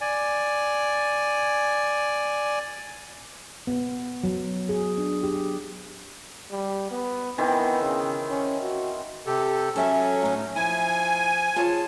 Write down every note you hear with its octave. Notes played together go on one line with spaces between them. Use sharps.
D5 G#5
B3
F#3
G#4
D4
G4
G3
B3
D#3 E3 B3 C4
C#3
C#4
F#4
C3 G4 A4
F#3 C#4 A4 E5 G#5
A2 D#4
F3 E4 G#5
F4 G#4 C#5 A5